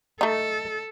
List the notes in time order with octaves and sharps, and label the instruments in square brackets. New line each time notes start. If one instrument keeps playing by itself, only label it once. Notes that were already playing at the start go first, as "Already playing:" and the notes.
[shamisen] A3 D#4 [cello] A4